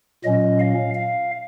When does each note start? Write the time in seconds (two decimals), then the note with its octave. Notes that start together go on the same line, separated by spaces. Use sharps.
0.24 A#2 F#3 C#4 D#5
0.59 F5
0.94 F5